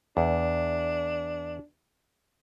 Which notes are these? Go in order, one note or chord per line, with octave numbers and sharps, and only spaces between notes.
E2 D4